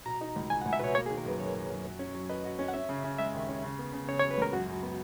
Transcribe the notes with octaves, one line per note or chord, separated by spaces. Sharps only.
B2 A#5
D#4
C#2
C#2 G#5
F#5
C#2
E5
B2 B4 C#5
A#3 C#5
G#4
D#3
A#4
F#2 B4
F#2 C#5
F#2
F#2
F#3
C#4
F#3
B4 D#5
F#4
C#4
F#5
C#4 E5
C#3
C#3
G#3 E5
D#2
C#4
C#3
B3
C#3
C#3 C#5
C#5
F#3
B4
C#2 A#4
F#2 F#4
F#2
B3